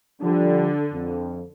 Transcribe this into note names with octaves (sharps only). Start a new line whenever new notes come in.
D3 F3 G3 D4
F2